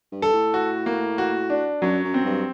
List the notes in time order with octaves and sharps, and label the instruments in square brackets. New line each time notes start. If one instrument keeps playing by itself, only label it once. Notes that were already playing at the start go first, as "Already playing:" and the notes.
[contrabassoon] G2
[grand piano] A4
[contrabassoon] A2
[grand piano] F#4
A#3
F#4
D4
[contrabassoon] F#2 [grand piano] F#3
[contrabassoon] F#2
[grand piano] C4
[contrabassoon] G2